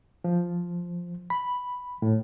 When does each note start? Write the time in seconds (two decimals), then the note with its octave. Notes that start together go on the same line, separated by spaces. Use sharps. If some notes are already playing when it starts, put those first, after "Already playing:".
0.24 F3
1.30 B5
2.02 A2